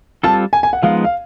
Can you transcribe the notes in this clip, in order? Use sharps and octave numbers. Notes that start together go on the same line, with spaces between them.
G3 C4 F4 A4 A5
G#5
G#5
F#5
F3 G#3 B3 D#4 F5
F5